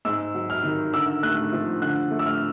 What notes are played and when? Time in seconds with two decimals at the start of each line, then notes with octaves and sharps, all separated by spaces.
0.05 G#2 E6
0.34 F#3
0.50 F6
0.63 D#3
0.93 D3 E6
1.23 A3 F#6
1.53 F3
1.82 D3 F#6
2.11 A3
2.19 E6
2.26 F6